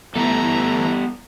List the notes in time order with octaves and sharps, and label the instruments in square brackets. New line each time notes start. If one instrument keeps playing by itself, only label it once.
[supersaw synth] E3 A3 E4 [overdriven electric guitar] G3 A4 [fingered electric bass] B3 [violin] A#5